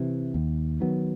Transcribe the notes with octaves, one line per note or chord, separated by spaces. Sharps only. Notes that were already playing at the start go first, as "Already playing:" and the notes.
Already playing: C3 E3
D#2
D#3 F#3 B3